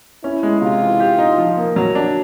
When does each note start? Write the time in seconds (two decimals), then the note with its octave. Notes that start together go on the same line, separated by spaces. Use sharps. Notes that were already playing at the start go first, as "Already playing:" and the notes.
0.23 C#4 E4
0.43 G#3
0.61 C3 F4
0.81 E3
1.00 G4
1.18 D#4
1.38 F3
1.57 A#3
1.76 F#3 F#4
1.95 D4